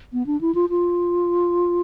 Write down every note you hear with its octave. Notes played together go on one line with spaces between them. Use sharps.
B3
D4
E4
F4
F4